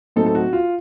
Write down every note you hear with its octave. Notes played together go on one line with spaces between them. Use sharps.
A2 F#3 C4 D#4 A4
A4
F#4
F4